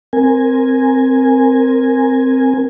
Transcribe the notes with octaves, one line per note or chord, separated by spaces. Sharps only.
C4 A#4 G#5